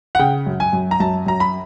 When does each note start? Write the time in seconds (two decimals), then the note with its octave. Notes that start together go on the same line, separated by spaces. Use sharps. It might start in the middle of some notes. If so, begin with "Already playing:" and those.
0.15 F#5
0.19 C#3 G5
0.46 F#2
0.60 G#5
0.73 F#2
0.91 A#5
1.00 F#2 A5
1.26 F#2 A#5
1.40 B5